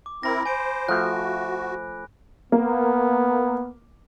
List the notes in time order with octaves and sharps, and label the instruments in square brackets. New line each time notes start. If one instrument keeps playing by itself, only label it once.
[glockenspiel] D6
[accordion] C4 E4 A#4 [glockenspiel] B5 A#6
[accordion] C5 [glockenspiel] G#5 D7
[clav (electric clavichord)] F3 A3 [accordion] F#4 [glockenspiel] F#6
[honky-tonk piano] A#3 [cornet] B3